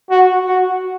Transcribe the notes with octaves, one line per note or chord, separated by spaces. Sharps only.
F#4
F#4